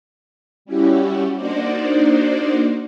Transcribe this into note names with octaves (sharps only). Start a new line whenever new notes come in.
G3 C#4 E4 F#4 G4
A#3 D4 D#4 F#4 C5 D5